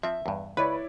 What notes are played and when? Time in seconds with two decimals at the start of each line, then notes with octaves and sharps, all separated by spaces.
0.03 F3 C4 E5
0.26 E2 G2
0.57 C#2 E4 B4 C#5 D5